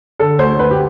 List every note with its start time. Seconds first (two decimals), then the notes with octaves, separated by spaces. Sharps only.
0.20 D3 A4
0.39 D2 C5
0.58 D2 B4
0.71 G4